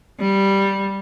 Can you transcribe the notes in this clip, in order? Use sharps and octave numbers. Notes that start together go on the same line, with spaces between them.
G3